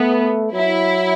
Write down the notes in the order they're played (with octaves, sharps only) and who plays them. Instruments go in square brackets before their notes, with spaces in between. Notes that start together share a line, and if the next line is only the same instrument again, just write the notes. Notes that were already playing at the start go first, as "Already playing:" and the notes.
Already playing: [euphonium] A3 [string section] B3
[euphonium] F#3 [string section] E4